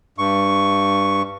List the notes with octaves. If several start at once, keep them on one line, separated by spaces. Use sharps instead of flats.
G2 C#6